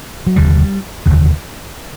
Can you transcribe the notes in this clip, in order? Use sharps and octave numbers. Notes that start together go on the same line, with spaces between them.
F#3
F1 D#2 D3 G3
F1 D#2 D3